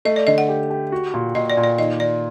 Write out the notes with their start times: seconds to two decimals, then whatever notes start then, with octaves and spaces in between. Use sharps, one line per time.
0.05 A3 D#5
0.16 D5
0.27 D3 D#5
0.38 F#5
0.49 G4
0.70 G4
0.92 F#4
1.14 A#2
1.35 A#2 D#5
1.50 D5
1.57 A#2
1.64 D5
1.78 D#3 D#5
2.00 D#3 D5